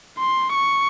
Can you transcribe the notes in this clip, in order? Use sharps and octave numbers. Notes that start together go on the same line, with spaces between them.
C6
C#6